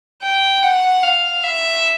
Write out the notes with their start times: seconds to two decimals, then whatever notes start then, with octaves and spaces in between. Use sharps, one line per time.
0.22 G5
0.63 F#5
1.03 F5
1.43 E5